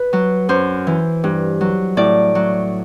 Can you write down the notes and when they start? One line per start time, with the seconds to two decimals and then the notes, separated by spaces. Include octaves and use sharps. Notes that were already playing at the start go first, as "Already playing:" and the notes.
Already playing: B4
0.13 F#3
0.49 F#2 C5
0.87 E3
1.24 G2
1.61 F#3
1.97 A2 D5
2.35 F#3